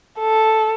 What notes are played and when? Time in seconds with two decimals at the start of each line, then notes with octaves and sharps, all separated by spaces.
0.19 A4